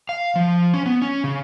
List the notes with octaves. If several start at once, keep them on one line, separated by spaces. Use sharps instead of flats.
F5
F3
C#4
B3
C#4
C#3